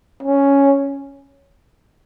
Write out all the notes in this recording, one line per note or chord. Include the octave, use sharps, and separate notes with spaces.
C#4